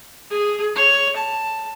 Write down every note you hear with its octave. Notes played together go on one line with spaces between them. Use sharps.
G#4
C#5
A5